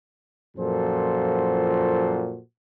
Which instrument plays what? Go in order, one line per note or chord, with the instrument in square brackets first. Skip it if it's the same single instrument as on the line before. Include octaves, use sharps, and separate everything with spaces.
[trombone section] F#2 A#2 F3 F#4 A4 C5